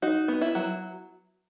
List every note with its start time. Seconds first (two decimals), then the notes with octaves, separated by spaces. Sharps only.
0.02 D#4 F#4
0.28 B3
0.41 E4
0.55 F#3